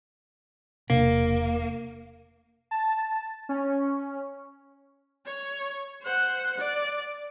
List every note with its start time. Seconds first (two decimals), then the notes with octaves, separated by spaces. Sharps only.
0.90 E1 C3 A#3 D4
2.71 A5
3.49 C#4
5.25 C#5
6.02 C5 F#5
6.58 D5